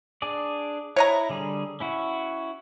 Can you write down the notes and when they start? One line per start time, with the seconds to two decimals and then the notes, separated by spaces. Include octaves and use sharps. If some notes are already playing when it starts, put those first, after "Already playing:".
0.22 D4 G#4 D5
0.96 E4 C#5 D#5 A#5
1.30 D3 G3 G#4
1.80 C#4 E4 F#4